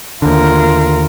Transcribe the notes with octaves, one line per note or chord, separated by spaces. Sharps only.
D#2 D3 F4 A#4